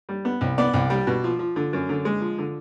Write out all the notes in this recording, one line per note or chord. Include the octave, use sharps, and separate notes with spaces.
G3
B3
C2
B3 D5
C2
G3
B2
F3
F3
D3
F#2
D3
G#3
F3
D3